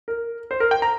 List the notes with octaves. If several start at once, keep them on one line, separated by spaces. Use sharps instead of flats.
A#4
C5
A#4
G5
A#5